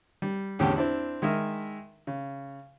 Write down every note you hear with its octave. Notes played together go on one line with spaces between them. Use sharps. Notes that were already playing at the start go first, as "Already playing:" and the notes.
G3
E2 A2 D3 C#4 G4 G5
C4 D4 E4
D#3 G#3 A#4 E5
C#3